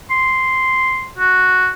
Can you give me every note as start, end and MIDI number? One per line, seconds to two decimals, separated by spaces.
0.11 1.10 84
1.18 1.70 66